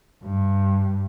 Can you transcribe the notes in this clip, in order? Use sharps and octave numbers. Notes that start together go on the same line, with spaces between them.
G2